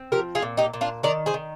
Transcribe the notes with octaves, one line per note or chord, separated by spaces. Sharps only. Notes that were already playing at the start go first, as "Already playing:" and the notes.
Already playing: C4
F3 G4 A#4
F4 G#4
A#2
D#4 G4
A#2
D4 F4
D#3 A#4 D5
G#4 C5
D#3